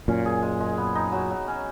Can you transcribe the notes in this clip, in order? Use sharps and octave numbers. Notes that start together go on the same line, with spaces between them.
F#2 A#2 C#4
G#4
G#3
G#3
B3
D#4
F#3
F#3
C#4